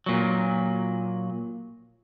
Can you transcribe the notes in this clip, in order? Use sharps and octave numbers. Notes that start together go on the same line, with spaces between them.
A#2 F#3